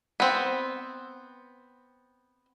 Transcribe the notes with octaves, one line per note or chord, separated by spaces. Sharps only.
B3 C4